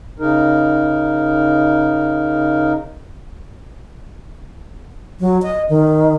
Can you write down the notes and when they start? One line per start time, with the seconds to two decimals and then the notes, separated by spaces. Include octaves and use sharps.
0.19 C#3 D#4 A#4
5.20 F#3
5.42 D#5
5.69 D#3